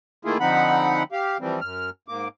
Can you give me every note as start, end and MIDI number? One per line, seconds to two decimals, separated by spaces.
0.25 0.38 51
0.25 0.38 57
0.25 0.38 58
0.25 0.38 64
0.25 0.38 65
0.25 0.38 68
0.40 1.03 50
0.40 1.03 53
0.40 1.03 60
0.40 1.03 63
0.40 1.03 78
0.40 1.03 83
1.12 1.38 67
1.12 1.38 77
1.40 1.60 52
1.40 1.60 53
1.40 1.60 55
1.40 1.60 60
1.61 1.90 42
1.61 1.90 89
2.08 2.28 44
2.08 2.28 58
2.08 2.28 86